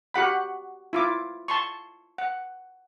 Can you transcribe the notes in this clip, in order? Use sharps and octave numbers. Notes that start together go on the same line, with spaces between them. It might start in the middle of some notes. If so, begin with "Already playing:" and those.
F#4 G4 F#5 B5
E4 F4 D6
A5 C6 C#6
F#5